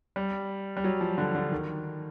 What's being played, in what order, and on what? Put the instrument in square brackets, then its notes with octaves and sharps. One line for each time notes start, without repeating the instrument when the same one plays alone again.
[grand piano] G3
G3
F#3
F3
D3
D3
D#3